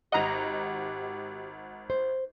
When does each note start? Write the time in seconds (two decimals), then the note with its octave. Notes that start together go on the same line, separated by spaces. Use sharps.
0.12 G#1 G4 D#5 F#5 A#5
1.90 C5